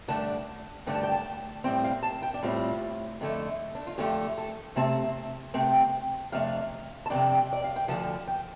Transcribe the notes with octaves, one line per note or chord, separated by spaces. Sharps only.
G2 D3 A3 D4 A5
G2 D3 A3 D4
A5
G5
A5
A2 G3 C4 G5
F5
A5
G5
D4
A2 G3 C4 F4
F2 D3 A3
D4
F4
F2 D3 A3 G4
A4
C3 A3 C4 A5
C3 A3 C4 G5
F2 C3 A3 D4 F5
A5
F2 C3 A3 D4 G5
D5
F5
G5
D2 D3 F3 A5
G5